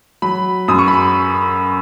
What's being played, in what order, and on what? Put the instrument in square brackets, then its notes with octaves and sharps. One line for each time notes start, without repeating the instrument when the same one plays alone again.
[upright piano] F#3 B5
F#2 D#6
C#6
B5